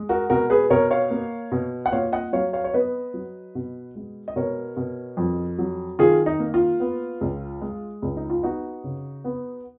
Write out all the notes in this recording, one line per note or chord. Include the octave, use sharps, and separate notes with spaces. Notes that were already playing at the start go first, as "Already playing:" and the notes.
Already playing: G#3
F#4 A#4
B2 F#4 A#4
G#4 B4
B2 A#4 C#5
C#5 F5
A#3
B2
F#5
A#2 C#5 F5
D#5 F#5
F#3 C#5 F5
C#5 F5
C#5
B3 B4 D#5
F#3
B2
G#3
D#5
B2 A#4 C#5
B2
F2
F#3
D#3 F4 G#4
D#4
A#3
F4
B3
C#2
G#3
C#2
D#4
F4
B3 D#4 F#4
C#3
B3